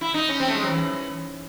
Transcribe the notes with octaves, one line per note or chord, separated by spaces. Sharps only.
E4
D#4
C#4
C4
A3
G#3
F#3
E3